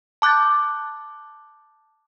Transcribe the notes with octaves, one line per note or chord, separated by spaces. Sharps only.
A5 D6 F#6 G6 A6